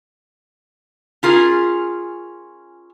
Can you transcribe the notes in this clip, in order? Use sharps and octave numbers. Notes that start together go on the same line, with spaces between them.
C#4 F4 G#4 A#4